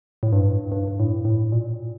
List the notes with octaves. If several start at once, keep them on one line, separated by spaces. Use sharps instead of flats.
A2
G2
G2
G2
A2
A2
A#2